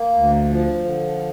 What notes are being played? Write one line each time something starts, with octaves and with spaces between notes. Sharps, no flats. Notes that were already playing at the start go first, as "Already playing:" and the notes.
Already playing: A#3
D2
F3
D3